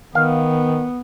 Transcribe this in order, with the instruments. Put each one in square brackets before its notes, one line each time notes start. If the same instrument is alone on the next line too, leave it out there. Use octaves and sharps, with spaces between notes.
[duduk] D#3 [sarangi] B3 [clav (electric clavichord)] F5